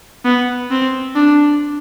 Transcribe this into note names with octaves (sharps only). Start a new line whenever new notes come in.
B3
C4
D4